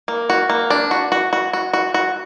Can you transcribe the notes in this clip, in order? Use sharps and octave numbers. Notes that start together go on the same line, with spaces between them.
A#3
F#4
A#3
D4
F#4
F#4
F#4
F#4
F#4
F#4